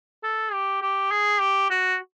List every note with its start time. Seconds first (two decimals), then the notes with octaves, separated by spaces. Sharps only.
0.24 A4
0.53 G4
0.82 G4
1.11 G#4
1.40 G4
1.70 F#4